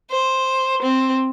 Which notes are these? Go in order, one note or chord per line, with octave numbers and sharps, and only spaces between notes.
C5
C4